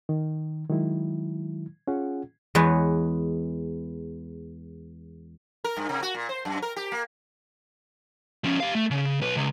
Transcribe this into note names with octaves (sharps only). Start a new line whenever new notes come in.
D#3
D#3 F#3 G#3 E4
C#4 F4 G#4 F#5
E2 G#3 B4 C#5
A#4
G2
C3
F#4
A#2
C5
F#2
A#4
G4
A#3
F3 C#4
G4 F5
A3
C#3
B1 B4
C#2